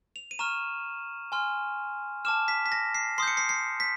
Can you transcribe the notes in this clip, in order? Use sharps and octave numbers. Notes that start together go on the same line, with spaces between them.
F7
D#7
A#5 C#6 F6 E7
G#5 C6 F6
A5 D6 F6 E7
B6
B6
A#6
C7
C6 D#6 G6 C7
C#7
C7
C7
B6